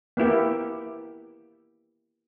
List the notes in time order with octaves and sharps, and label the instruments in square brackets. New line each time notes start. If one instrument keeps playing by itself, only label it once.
[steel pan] A#3 B3 E4 G4